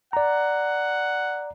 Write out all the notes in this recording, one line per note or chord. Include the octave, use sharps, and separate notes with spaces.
D5 F#5 A#5